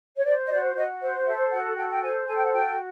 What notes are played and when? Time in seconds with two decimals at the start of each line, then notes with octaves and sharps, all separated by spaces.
0.16 C#5
0.25 C5 D5
0.46 D#5
0.50 F#4 D5
0.75 F#4 D#5
1.01 C5 E5
1.26 A4 E5
1.52 F#4 F#5
1.76 A4 G5
1.91 G5
2.02 C5 G#5
2.27 A4 G#5
2.36 G5
2.44 F#5
2.53 F#4 G5